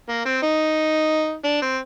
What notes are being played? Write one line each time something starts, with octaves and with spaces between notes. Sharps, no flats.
A#3
C4
D#4
D4
C4